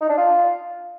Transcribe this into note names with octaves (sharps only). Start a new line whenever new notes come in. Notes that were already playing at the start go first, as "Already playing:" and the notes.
D#4
D4
F4